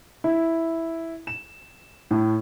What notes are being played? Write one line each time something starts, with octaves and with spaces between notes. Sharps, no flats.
E4
E7
A2